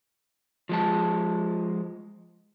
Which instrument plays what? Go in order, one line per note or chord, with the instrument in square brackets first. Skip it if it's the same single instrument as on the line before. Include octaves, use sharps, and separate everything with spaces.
[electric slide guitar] F3 G#3 A5